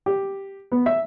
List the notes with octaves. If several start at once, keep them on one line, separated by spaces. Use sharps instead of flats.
G4
B3
E5